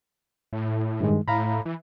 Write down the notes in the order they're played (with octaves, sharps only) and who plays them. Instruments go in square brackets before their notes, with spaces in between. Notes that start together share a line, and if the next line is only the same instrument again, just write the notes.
[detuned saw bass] A2
[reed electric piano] G2 D#3 G#3
[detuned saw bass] A2 [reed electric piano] F5 A#5 B5
[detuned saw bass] E3